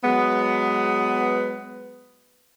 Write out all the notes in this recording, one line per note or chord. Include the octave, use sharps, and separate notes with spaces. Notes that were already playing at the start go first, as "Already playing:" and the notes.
F#3 G#3 B3